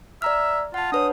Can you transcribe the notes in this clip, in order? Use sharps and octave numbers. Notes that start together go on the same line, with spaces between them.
D5 E5 A#5 F6
F4 F#5 A5
D4 B4 C#5 D#6